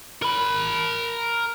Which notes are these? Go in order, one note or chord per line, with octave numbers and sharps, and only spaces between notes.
A#4 B5